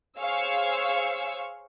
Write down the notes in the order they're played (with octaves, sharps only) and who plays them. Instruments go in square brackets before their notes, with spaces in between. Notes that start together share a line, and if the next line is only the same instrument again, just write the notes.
[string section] G#4 C5 C#5 F5 C#6 E6